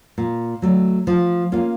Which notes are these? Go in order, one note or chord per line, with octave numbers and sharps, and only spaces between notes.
A#2
F#3 A3
F3
A#3 C#4 F4